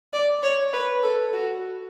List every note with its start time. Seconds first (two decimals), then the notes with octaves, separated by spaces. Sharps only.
0.13 D5
0.43 C#5
0.73 B4
1.03 A4
1.33 F#4